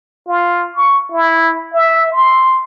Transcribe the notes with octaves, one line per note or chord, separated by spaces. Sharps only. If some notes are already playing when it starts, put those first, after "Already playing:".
F4
C#6
E4
E5
C6